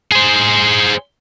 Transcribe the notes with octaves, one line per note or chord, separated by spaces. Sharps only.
G#4 C5